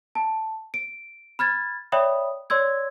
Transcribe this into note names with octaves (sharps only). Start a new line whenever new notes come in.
A5
D7
B5 F6 G#6 A6
C#5 D5 E5 G5 B5 D#6
C#5 D5 C6 E6 G#6